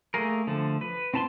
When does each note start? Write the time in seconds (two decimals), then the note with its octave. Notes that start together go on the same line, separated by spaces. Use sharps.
0.14 A3 A#3 G#4 A#4
0.47 D3 F3 A3
0.81 B4
1.14 C4 E4 A5 A#5 C6